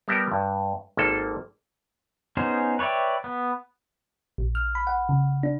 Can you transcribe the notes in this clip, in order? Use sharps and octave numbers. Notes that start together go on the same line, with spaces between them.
G3 B3 A#4 G5 A5
G2
G#1 A#3 A4
B3 C#4 D#4 G#4 C5
B4 C#5 D5 E5 G5
B3
A#1
F6
B5
F#5
C#3
D4